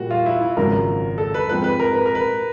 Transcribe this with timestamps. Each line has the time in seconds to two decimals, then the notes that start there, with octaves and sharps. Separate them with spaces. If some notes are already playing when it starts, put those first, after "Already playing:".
Already playing: A#2 G3 A#3 F#4
0.11 F4
0.26 E4
0.41 E4
0.57 G#1 F#2 C#3 F3 A#3 A#4
1.18 A4
1.34 B4
1.49 G#2 F3 G#3 C4 B4
1.64 B4
1.80 A#4
1.95 B4
2.06 A#4
2.15 B4